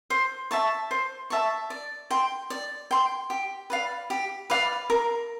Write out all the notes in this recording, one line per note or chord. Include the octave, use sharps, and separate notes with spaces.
C5
E5 A5 C#6
C5
E5 A5 C#6
D5
G5 C6
D5
G5 C6
G4
B4 D5 F5
G4
B4 D5 F5
A#4